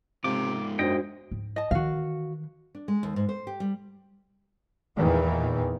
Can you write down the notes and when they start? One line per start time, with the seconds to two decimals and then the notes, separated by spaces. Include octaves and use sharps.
0.24 G#2 C3 F4 D6
0.79 F#2 D4 F#4 C5 D#5 G5
1.31 G#2
1.56 D#5 A5
1.71 D#3 E3 F#4 F5
2.75 D4
2.88 G#3
3.03 D#2
3.16 G#2
3.29 C5
3.47 G4
3.60 G3
4.98 E2 A#2 D#3 E3